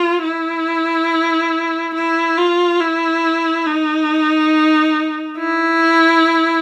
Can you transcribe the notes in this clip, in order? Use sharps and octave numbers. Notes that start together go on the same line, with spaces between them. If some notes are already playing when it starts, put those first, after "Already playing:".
Already playing: F4
E4
E4
F4
E4
D#4
E4